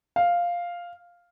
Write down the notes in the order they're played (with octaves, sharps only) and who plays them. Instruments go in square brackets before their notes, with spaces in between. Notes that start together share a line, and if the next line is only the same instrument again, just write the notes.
[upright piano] F5